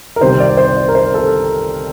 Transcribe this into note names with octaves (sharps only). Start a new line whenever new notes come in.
A#4
C2 C3 D#3 C5
D5
C5
D5
A#4
C5
A4